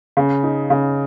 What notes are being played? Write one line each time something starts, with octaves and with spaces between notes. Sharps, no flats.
C#3
D#4
C#3